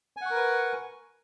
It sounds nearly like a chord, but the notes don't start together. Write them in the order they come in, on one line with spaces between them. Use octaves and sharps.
G#5 F#5 C#6 A#4 B4